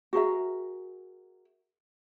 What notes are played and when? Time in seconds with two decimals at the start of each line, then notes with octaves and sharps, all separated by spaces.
0.13 F#4 G#4 A#4 E5